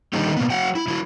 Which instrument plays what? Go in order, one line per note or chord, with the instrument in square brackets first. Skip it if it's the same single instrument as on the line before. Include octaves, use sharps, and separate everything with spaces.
[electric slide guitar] D3 D#3 G3 A#3 D#4 G4
B2 A#3 B3
F#3 F#5 G5
E4
F#3 E4